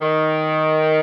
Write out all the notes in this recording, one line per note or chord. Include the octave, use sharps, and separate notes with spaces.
D#3